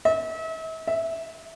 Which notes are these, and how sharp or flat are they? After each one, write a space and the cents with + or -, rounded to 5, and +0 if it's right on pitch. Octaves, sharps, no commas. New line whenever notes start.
E5 -40
E5 -5